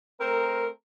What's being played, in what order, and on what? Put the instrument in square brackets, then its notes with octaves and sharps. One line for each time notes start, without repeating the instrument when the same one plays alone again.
[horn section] A3 C4 A#4